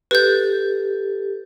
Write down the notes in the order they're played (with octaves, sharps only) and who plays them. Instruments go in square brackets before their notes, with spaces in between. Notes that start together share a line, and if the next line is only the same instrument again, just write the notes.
[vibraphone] G4 A4 [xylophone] B4 G6